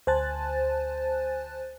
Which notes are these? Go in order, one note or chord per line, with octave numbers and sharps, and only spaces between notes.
D2 C5 G#5 A5 F#6 A6